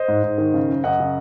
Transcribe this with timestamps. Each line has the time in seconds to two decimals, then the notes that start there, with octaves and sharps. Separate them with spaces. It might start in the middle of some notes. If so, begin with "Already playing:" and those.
Already playing: C5 D#5
0.08 G#2
0.23 G#2
0.38 D#3
0.54 C#3
0.69 F#2
0.84 F#2 D#5 F#5
1.00 C#3